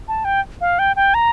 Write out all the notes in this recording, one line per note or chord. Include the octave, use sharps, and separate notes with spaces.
A5
G5
F5
G5
G5
A#5